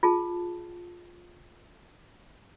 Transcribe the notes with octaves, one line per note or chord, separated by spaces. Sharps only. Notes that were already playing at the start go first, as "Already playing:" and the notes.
F4 G#4 A5